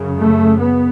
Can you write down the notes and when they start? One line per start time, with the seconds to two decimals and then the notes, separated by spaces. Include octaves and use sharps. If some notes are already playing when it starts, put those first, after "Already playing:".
Already playing: F#2 C#3
0.16 A3
0.61 B3